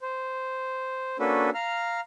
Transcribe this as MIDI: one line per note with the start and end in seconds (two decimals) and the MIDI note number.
0.02 1.17 72
1.20 1.50 58
1.20 1.50 61
1.20 1.50 62
1.20 1.50 66
1.20 1.50 69
1.20 1.50 71
1.54 2.00 77
1.54 2.00 82
1.54 2.00 89